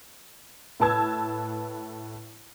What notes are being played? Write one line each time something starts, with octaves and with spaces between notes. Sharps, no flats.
A2 B4 A5 E6 G#6